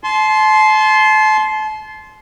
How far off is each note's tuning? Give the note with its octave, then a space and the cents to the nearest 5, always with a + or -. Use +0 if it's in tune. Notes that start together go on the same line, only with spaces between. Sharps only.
A5 -35 C6 +0